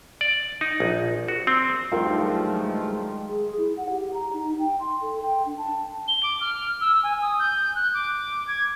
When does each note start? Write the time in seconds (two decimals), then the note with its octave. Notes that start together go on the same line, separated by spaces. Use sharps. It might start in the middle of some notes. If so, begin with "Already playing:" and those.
0.21 D5
0.61 D#4
0.80 A#1
1.28 F#4
1.47 C4
1.92 G2 D#3 F3 F#3 G#3 A3 F4 A#4
3.29 G#4
3.58 E4
3.77 F#5
3.90 G4
4.14 A#5
4.33 D#4
4.59 G5
4.80 C6
5.01 A4
5.23 G5
5.46 D4
5.57 A5
6.08 G7
6.23 D6
6.41 F6
6.81 E6
7.03 G#5
7.22 D#6
7.39 G6
7.75 F#6
7.94 D6
8.48 G#6